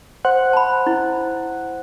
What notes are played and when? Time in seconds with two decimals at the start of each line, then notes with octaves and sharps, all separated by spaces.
0.25 C5 F#5 F#6
0.53 A5 B5
0.87 E4